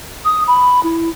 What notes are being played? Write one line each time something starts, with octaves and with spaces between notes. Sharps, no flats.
D#6
B5
E4